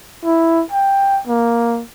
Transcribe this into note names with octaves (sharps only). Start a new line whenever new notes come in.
E4
G5
A#3